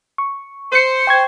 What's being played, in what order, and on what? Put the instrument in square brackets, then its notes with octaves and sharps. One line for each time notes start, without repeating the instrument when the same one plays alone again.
[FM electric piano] C#6
[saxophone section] C5 [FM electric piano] C6 C#7
[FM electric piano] G5 C#6 G#6